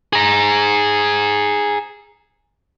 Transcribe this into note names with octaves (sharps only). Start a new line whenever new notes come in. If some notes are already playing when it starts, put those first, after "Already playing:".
G#4 A#5